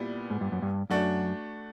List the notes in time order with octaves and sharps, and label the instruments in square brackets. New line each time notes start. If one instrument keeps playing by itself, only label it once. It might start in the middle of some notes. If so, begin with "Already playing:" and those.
Already playing: [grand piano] A#2 G3 B3 E4
[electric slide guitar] G#2
G2
F#2
G2
[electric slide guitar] F#2 [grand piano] A3 D4 F#4